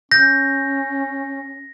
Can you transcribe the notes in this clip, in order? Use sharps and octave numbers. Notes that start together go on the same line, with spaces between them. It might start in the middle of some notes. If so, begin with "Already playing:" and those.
C#4 G6 A#6